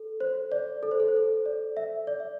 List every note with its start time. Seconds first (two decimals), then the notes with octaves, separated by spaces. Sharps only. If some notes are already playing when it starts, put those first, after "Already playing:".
Already playing: A4
0.20 C5
0.52 D5
0.83 A4
0.91 C5
1.00 A4
1.08 C5
1.16 A4
1.46 D5
1.77 E5
2.07 D5
2.20 E5